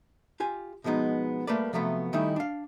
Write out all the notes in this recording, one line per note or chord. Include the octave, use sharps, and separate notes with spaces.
F4 G4 G#5
B2 F3 G#3 B3 D#4
G3 A3 A#3 B4 D5
C3 F3 F#3 A3 B3 B4
D#3 G3 A3 C#4 D#4 E4
D4 F5